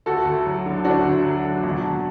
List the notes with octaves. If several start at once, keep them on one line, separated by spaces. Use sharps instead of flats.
D2 F#4 A4
D2
F#3
D3
D2 D4 F#4
D2
F#3
D3
E1
E1